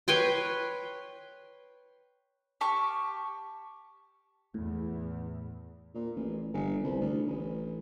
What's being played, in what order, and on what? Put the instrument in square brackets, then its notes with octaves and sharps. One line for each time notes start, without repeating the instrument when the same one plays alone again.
[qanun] B4 C#5 G5 C6
[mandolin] G4 A5 C#6 F6
[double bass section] E2 [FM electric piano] A2
[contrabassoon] A#2
A1
G1
C2
D2
A1